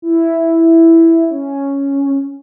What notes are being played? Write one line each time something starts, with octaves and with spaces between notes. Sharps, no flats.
E4
C#4